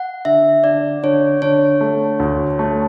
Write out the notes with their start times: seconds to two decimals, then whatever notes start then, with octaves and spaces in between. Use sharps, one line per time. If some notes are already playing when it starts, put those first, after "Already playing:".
Already playing: F#5
0.25 D3 E5
0.64 D3 D5
1.03 D3 C#5
1.42 D3 C#5
1.81 A3
2.20 D2
2.59 A3